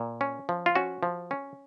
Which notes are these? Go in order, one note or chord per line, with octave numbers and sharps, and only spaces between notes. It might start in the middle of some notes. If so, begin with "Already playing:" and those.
Already playing: A#2
C#4
F3
F4
C#4 F#4
F3
C#4